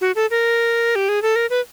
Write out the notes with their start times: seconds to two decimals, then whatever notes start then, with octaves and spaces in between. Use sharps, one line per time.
0.01 F#4
0.16 A4
0.31 A#4
0.96 G4
1.09 G#4
1.22 A4
1.36 A#4
1.50 B4